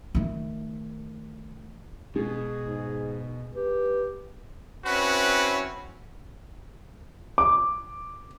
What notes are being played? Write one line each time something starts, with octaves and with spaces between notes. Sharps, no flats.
D#3 A3
B2 G#3 G#4
G#2
G4 B4
C4 C#4 E4 F#4 B4
D6